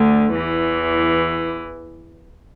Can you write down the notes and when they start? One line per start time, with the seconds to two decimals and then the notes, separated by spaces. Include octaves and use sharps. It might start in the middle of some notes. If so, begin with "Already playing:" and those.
Already playing: D2 D3
0.35 E2 E3